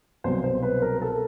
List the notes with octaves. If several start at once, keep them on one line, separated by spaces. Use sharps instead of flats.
C2 B2 F#3 C5
C5
B4
A#4
A4